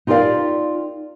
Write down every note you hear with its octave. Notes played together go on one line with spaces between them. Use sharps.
D#4 F4 G4 A#4 D5 F5